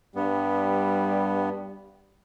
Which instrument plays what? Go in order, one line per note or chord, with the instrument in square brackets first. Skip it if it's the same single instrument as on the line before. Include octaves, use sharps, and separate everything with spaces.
[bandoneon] G2 B3 [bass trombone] G3